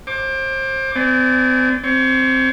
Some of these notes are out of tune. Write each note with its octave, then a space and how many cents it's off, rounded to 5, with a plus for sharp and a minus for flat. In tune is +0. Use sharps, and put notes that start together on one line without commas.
C5 +30 D6 +10
C4 -35 D5 -20 G#5 -10
C4 +0 C#5 +30